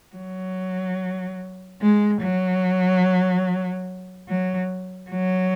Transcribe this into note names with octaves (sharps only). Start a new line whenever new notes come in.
F#3
G#3
F#3
F#3
F#3